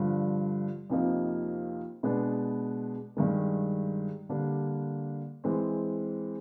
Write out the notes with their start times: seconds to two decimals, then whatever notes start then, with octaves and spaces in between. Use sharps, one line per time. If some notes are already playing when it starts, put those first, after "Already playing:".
Already playing: G2 D3 F3
0.90 F2 C3 F3 A#3 D#4
2.03 B2 G#3 B3 D4
3.17 G2 D#3 G#3
4.29 D3 G3 A#3 D4
5.44 E3 G#3 C4